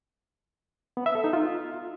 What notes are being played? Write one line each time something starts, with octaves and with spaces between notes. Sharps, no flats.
B3
E5
A4
D#4
F4